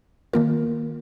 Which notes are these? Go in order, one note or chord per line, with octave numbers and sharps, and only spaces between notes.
D#3 A#3 F4 A#4